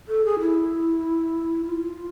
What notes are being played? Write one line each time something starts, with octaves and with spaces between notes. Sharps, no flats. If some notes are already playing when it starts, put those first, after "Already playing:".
A4
G#4
E4
F4